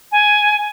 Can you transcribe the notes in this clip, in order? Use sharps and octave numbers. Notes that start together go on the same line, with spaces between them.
G#5